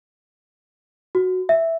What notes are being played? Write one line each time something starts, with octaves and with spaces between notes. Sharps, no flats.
F#4
E5